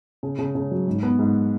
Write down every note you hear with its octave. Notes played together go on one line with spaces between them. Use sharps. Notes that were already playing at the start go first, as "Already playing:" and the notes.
C#3
C#3
C#3
F#3
G#2
B3
G#2